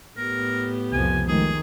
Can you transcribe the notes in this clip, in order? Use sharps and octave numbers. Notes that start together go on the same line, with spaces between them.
A2 B3 G4 A#4
C2 F2 C3 F3 G#5
D#3 F3 G#3 A3 G#4